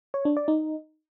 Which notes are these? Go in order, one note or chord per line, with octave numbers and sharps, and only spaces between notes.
C#5
D4
D5
D#4